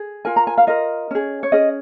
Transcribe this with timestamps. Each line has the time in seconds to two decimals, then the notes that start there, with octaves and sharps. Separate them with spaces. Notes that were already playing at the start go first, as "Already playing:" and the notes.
Already playing: G#4
0.25 F4 A#4 G#5
0.36 A#5
0.47 G#5
0.58 F5
0.67 F4 A#4 D#5
1.11 C#4 G#4
1.43 C#5
1.52 C#4 G#4 D#5